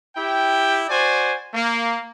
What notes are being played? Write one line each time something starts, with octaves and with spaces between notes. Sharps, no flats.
E4 G4 G5
F#4 C5 D5 G#5
A#3